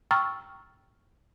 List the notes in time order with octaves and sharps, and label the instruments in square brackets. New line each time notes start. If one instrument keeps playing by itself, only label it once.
[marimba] G5 A#5 C#6 E6 F6 A6